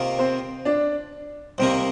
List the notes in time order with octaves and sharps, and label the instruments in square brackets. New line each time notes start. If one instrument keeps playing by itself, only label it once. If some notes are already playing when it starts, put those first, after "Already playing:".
Already playing: [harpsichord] C3 D#3 A#3 F4
[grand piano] C4 C5
D4 D5
[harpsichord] C2 C3 D#3 A#3 [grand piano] C4 C5